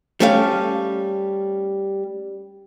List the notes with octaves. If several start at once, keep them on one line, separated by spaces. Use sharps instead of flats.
G3 A3 C#4 A4 F5